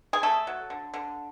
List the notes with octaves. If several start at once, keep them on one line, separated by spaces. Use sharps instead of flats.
G#4
A3 A4
F#3
D3
D3